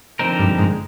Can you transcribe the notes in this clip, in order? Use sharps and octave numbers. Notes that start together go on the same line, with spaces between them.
D3 F3 C4 D#4 A#4
G2
G#2